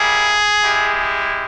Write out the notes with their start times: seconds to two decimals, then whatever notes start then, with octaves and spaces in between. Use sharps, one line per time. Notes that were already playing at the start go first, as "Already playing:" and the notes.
Already playing: G3 A#3 E4 G#4
0.63 G#3 E4 G4